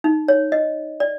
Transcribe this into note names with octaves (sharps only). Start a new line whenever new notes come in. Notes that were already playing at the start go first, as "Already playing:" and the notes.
D#4
C#5
D#5
D5